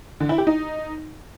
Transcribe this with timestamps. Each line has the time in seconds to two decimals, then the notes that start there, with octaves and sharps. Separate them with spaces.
0.20 D3
0.29 E4
0.38 G4
0.47 D#4